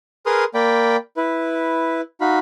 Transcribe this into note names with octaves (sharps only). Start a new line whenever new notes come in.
G#4 A#4 B4 C6 D#6 F6
A#3 D5 G5 B5
E4 B4
D#4 F#4 F5 B5